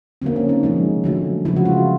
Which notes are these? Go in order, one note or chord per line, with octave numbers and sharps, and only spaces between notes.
D3 F#3 A#3 C4
C#4
D#4
C3 F3 G#3
D3 F#3 A3
C#3 F3 G#3 E4
F#4
F4